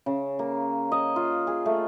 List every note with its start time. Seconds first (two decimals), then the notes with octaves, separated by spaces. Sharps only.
0.06 C#3
0.39 A#3
0.92 D#5
1.16 F4
1.47 G#4
1.66 A3